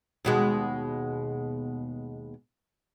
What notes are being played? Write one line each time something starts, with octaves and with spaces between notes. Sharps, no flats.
D#2 B2 G#3